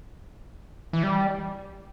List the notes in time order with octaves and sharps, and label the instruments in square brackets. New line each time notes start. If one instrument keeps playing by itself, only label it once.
[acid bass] E3
G3